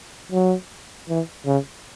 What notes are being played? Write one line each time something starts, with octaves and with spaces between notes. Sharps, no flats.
F#3
E3
C#3